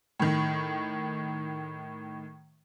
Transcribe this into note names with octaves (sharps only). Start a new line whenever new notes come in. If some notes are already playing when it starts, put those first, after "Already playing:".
A2 D#3